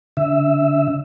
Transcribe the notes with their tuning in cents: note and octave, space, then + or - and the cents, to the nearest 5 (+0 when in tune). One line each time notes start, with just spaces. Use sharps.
D3 -30 E5 +0